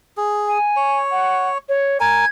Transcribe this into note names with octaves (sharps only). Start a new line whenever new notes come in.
G#4
G#5
C#5
F#5
C#5
A#4 G#5 G#6